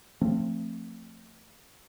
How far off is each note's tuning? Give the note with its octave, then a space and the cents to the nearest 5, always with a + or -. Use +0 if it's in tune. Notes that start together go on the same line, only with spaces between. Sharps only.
F3 +0 A3 +30 C4 +25